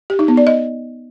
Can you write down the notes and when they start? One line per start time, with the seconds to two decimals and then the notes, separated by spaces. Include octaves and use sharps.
0.10 G4
0.19 D#4
0.28 B3
0.37 D5
0.47 D#5